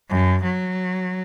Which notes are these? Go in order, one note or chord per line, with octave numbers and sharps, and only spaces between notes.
F#2
F#3